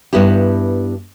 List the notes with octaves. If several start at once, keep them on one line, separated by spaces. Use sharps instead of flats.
G2 B3 E4 G4